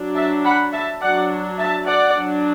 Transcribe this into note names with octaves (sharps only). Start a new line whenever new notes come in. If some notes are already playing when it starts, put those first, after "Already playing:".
Already playing: F#3 D4
E5 A5
F#5 B5
E5 A5
F#3 D4 D5 F#5
E5 A5
D5 F#5
F#3 D4